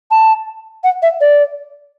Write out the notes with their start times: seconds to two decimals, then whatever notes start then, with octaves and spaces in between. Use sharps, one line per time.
0.11 A5
0.84 F#5
1.02 E5
1.21 D5